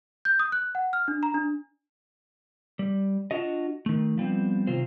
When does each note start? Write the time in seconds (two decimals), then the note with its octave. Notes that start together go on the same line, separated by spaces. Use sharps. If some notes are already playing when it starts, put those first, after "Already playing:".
0.25 G6
0.39 D#6
0.52 F#6
0.75 F#5
0.93 F6
1.08 D4
1.23 A#5
1.34 D4
2.79 G3
3.31 D4 F4 F#4 D#5
3.86 D#3 A3
4.18 F3 G3 B3 C4
4.67 C3 D#3 F#3 F4 C5